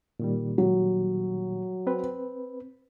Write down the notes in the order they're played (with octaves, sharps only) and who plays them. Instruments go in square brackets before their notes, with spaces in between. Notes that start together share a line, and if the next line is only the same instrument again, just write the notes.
[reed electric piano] A#2 D#3 G3
[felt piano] F#3
[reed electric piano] C4 B4